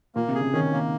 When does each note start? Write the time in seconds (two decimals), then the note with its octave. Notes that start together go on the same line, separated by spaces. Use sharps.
0.15 A#2 A#3
0.28 C3
0.35 G#4
0.41 C#3
0.54 D#3 C#4
0.73 A#3